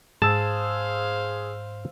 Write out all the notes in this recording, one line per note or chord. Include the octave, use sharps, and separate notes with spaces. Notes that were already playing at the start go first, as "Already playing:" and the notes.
G#2 G#4 C5 F5 A5 E6